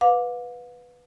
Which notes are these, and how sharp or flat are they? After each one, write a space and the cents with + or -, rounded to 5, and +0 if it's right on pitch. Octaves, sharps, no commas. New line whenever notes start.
B4 +0 F5 +40 D6 +0